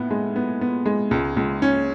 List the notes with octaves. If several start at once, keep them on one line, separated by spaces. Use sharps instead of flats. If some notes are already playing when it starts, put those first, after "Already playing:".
Already playing: A2 B3
G#3
B3
B3
G#3
C#2
C#2
C#4